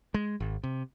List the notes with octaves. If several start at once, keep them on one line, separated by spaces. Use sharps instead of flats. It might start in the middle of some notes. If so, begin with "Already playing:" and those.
G#3
G#1
C3